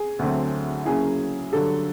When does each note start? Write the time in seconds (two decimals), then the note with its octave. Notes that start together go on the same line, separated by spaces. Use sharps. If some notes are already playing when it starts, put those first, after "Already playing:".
Already playing: G#4
0.19 D2 D3 F#3 A3 C4
0.85 C#3 F#3 A#3 C#4 E4 G#4
1.52 G2 D3 F#3 A4